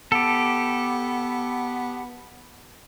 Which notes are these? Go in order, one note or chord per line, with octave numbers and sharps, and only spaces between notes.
B3 G4 A4